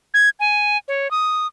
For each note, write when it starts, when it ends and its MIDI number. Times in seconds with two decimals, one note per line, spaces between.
0.14 0.29 92
0.40 0.77 80
0.88 1.10 73
1.11 1.47 87